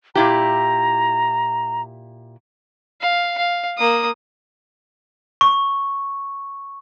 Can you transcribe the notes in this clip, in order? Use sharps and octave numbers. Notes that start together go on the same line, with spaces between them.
A#2 E4 G4 A#5
F5
F5
A#3 D#6
C#6